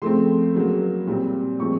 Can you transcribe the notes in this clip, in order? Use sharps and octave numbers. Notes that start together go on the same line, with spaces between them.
C#3 F3 A3 C4 C6
C#3 F#3 A#3
A#2 G3 C4
A#2 F3 G#3 C4 C#6